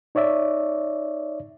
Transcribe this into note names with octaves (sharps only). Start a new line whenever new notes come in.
D#4 C#5 D5 E5